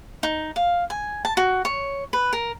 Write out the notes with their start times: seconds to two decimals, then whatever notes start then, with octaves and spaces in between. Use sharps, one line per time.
0.23 D#4
0.56 F5
0.90 G#5
1.25 A5
1.37 F#4
1.65 C#5
2.13 B4
2.33 A#4